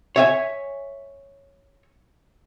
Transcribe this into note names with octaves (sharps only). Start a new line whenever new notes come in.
C#5 E5 G#5